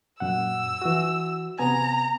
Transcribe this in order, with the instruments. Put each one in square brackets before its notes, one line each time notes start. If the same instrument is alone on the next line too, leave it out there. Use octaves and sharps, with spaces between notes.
[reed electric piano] F#2 A#2 F#5 [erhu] E6
[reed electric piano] E3 F#4
[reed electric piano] C3 B3 G#5 [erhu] A#5